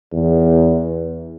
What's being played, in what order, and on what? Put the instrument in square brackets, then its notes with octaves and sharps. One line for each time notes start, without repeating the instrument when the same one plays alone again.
[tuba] E2